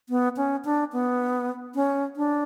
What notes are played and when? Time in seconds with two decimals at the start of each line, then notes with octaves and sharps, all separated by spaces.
0.09 B3
0.37 C#4
0.65 D4
0.93 B3
1.75 C#4
2.16 D4